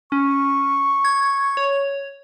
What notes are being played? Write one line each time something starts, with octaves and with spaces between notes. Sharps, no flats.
C#4 C#6
G#6
C#5